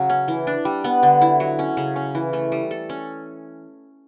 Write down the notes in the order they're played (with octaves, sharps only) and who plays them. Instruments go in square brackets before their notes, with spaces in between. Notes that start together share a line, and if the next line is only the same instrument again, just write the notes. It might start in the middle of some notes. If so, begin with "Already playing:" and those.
Already playing: [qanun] C#3 F#3
C#4
E3
D4
G3
B3
D3
E4
F#3
C#4
C#3
C#4
E3
A3
G3
A4
C#4